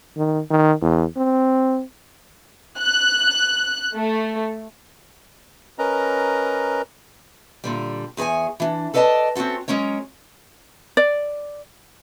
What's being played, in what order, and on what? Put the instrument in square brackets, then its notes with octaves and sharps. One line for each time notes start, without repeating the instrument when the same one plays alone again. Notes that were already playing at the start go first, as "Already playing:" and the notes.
[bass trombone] D#3
D#3
E2
C4
[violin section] F#6
A3
[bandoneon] C#4 A#4 B4 D#5 A#5
[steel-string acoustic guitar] A#2 D3 G3
E2 G#4 B4 C#5 G#5
E3 D4
A4 B4 D5 D#5 G#5 A5
C4 C#4 D#4 F#4 A4
F#3 G#3 C#4 A#4 C#5
[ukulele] D5